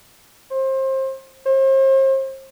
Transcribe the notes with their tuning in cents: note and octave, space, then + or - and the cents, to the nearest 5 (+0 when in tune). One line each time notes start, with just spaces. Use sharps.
C5 +25
C5 +40